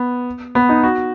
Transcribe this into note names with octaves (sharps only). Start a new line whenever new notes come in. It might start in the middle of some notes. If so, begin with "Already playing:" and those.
Already playing: B3
B3
D#4
F#4